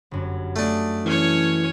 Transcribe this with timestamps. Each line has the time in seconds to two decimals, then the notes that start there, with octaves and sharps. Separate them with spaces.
0.11 G1 F#2
0.56 A3 D4 G#5 D#6 C7
1.05 E3 C#4 C#5